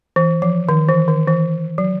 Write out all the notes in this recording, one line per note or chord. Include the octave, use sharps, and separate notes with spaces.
E3
F3
D#3
E3
D#3
E3
F#3